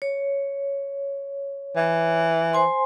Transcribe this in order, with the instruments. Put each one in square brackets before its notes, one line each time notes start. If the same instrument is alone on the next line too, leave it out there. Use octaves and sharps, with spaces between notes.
[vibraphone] C#5
[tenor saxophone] E3
[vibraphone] C5 G#5 C6